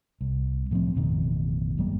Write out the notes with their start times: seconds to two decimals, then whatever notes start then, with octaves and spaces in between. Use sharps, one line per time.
0.21 C2
0.71 A2 F3 G3 C4
0.95 A1 F2 B2 D#3
1.78 G1 F#3 G3 A#3